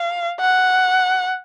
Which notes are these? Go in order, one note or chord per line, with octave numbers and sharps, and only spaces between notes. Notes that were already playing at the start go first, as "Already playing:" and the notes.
Already playing: F5
F#5